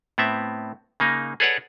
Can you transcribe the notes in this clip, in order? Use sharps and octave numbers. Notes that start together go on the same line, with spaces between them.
A2 B3 C4 E5
C#3 A#3 D#4
G#4 A4 B4 C#5 D5 F#5